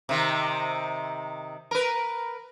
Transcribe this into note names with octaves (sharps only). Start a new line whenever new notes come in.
C3 D#3
A#4 B4